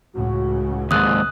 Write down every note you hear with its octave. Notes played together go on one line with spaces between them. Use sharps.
C#2 A2 C#3 F#4
D#2 G#2 D#6 E6 F#6